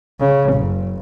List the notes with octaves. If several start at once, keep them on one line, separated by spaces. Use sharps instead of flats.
C#3
F#1